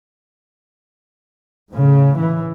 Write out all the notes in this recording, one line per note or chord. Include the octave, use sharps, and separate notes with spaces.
A2 C#3
E3